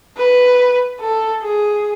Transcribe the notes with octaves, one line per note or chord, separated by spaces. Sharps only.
B4
A4
G#4